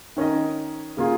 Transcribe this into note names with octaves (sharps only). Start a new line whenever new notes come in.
D#3 C#4 A#4 D#5
C#3 A#3 F4 G#4